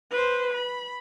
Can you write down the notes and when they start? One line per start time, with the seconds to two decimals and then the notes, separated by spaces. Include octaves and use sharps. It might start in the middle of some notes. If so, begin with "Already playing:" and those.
0.11 B4 C5
0.54 B5